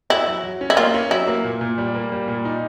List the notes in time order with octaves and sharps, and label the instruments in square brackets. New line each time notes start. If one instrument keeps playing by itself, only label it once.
[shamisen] E4 [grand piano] F#4
[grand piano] F#3
F#3
C#4
[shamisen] E4
[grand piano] A#3 [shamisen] F4
[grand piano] C#4
[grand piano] F#3 [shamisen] E4
[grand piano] A#3
A#2
A#2
G3
A#3
G3
A#2
D#4